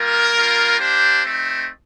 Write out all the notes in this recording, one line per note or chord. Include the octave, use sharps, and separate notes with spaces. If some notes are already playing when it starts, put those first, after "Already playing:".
Already playing: G3 A#3 F4 A#4
G3 A#3 F4
A#3 D4 G4 C5
A3 C4 D#4